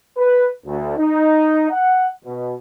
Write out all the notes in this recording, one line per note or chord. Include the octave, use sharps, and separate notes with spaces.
B4
D2
D#4
F#5
B2